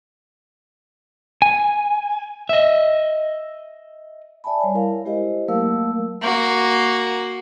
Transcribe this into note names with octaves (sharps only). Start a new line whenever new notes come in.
G#5
D#5 E5
D5 E5 G#5 A5 B5
G3 C#5 G#5
E4 A#4 F5
G#3 E4 G4 C5 D#5
F#3 A3 A#3 A#4 F5 E6
A#3 F#4